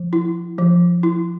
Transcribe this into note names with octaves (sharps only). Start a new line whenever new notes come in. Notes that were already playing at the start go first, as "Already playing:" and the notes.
Already playing: F3
E4
F3
E4